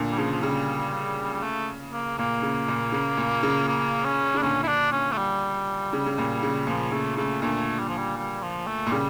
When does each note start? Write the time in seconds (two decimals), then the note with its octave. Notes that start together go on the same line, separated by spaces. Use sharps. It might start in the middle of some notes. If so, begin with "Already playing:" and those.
Already playing: A#2 D3
0.12 G3
0.18 C#3 F3
0.32 F3
0.43 C#3 G3
1.33 G3
1.43 A3
1.93 A#3
2.18 A#2 A#3
2.42 C#3
2.68 A#2
2.92 C#3
3.17 A#2
3.43 C#3
3.68 A#3
4.05 C#4
4.34 C#3 D4
4.42 A#2 D3 C#4
4.63 E4
4.68 D4
4.92 C#4
5.12 A3
5.18 G3
5.93 C#3
6.06 C#3
6.18 A#2
6.43 C#3
6.67 A#2 F3
6.92 C#3 A3
7.17 C#3 A3
7.42 A#2 D3 A3
7.80 G3
7.89 F3
7.97 G3
8.17 G3
8.42 F3
8.67 A3
8.86 A#2
8.92 C#3 G3